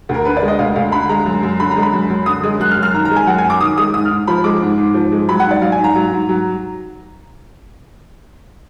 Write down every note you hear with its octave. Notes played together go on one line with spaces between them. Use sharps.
D2 A#4
D3 B4
D5
G#3
D#5
D2 F5
D2 F5
D3 B5
G#3 A#5
F#2
F#2
D3 B5
A#5
G#3
B5
F#2
F#2
D3 D#6
G#3 D#6
F#2 F#6
F6
F#2
F6
D#3 A#5
A#5
G#3
G#5
F#2 F#5
G#5
F#2
D6
D#3 D#6
G#3 D#6
G#2 D#6
F6
G#2
F3 B5
G#3 D6
G#2
G#2
F3
G#3
F#3 B5
F#5
G#2
D5
F#3 F5
G#5
G#2
A#5
F#3
G#2
F#3